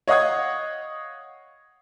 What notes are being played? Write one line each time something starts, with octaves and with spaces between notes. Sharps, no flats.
C#5 D#5 F5 F#5 D#6 G#6